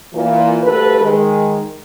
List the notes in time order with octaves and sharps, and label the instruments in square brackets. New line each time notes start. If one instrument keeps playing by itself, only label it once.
[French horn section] A#2 E3
D2 G2 A4 B4
D#3 G#3